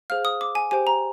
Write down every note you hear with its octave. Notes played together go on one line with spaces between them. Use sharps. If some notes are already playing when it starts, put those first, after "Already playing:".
G#4 C5 F5 F6
D#6
D6
G#5
G4 C5 G5 G#5
A#5